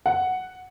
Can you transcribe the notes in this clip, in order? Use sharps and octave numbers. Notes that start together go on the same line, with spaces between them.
F#5